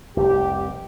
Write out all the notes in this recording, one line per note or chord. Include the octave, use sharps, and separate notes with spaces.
F1 C2 G4